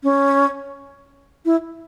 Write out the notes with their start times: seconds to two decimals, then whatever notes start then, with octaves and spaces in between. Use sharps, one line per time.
0.03 C#4
1.45 E4